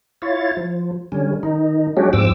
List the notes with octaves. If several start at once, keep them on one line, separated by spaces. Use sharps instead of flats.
E4 F4 C#5 A6
F3
D3 G3 C#4
D#3 D#4
F#3 G#3 C#4 D4 F#4 G4
E2 G#2 F3 C4 D6 E6